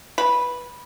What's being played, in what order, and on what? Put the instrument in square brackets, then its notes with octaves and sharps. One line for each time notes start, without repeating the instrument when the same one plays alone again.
[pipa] B4